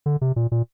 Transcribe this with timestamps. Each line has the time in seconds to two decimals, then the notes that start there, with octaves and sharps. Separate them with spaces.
0.06 D3
0.21 C3
0.36 A#2
0.52 A#2